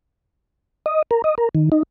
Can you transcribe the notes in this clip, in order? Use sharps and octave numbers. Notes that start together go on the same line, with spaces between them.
D#5
A#4
D#5
A#4
D#3
D#4